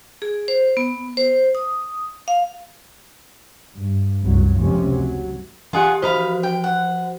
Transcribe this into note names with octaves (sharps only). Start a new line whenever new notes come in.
G#4
C5
B3
C5
D#6
F5
G2
C2 F#2 F#3
F1 C#2 C3 F3 C#4
F#3
E3 F4 G4 G#4 F#5
F3 F#4 C5 D#5 F5 B5
G5
F#5